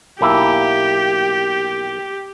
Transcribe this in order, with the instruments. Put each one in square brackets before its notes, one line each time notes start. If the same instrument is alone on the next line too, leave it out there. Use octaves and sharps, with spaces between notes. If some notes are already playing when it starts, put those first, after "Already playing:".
[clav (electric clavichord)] B1 A#3 E4 [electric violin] G4